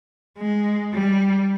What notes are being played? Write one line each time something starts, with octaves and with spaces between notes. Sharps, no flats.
G#3
G3